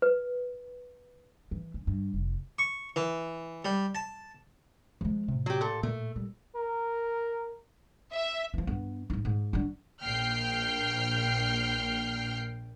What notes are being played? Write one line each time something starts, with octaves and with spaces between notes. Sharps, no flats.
B4
E3
C#4
G2
F1
C#6
E3
G3
A5
F3 G#3
A2 C3
F#3 G4
A#2 A4
A#2 A3 A#3
G3
A#4
E5
E3 F3
G2 B3
G#2 D#4
G#2
F#3 D4
A#1 A#2 G5 F6 G6 C7